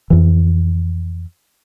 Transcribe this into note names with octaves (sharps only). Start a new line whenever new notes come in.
F2 E3